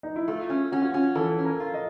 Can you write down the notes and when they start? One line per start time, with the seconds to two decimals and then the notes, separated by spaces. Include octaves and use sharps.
0.03 D#4
0.16 E4
0.28 A3 F4
0.50 C#4
0.72 C#4 F#4
0.82 F4
0.92 C#4 F#4
1.15 E3 A4
1.38 C#4
1.45 A#4
1.60 F4
1.74 D#5